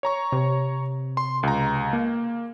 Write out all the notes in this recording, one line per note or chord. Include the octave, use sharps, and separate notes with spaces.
C#5 A#5 C#6
C3
C6
C#2 A#5
A#3